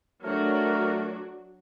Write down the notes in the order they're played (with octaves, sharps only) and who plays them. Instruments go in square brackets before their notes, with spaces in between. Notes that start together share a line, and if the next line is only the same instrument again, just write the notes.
[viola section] F#3 D4 F#4 [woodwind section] A3 A#4